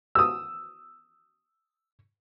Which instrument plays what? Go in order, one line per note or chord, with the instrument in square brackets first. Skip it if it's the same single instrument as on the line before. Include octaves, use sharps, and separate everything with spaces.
[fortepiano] D#6 E6